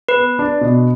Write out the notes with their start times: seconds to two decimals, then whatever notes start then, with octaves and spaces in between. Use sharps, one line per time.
0.09 B4
0.16 B3
0.39 D4
0.61 B2